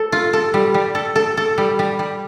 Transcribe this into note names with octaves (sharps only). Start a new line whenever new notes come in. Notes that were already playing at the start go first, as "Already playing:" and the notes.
Already playing: A4
F4
A4
G3
G3
A4
A4
A4
G3
G3
G3